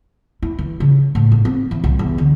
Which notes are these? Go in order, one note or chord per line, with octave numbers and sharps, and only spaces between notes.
E4
E3
C#3
A2
G#1
C4
E3
C2
E2
D3